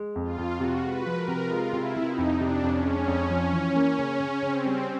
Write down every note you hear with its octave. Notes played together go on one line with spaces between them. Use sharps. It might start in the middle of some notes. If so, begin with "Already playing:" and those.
Already playing: G#3
F2
F4
F2
F#4
C3
G#3 B4
F3
A#4
C3
F4
G#3
C3 E4
C3
D#4
F2
D4
C3
F2 C#4
G#3
F2
F3
E3
A#3
C#3
C#3
C#3 C4
G3